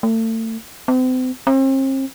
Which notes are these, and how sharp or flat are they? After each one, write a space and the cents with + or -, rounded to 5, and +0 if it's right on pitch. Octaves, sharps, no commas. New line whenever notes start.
A3 +35
C4 -40
C4 +40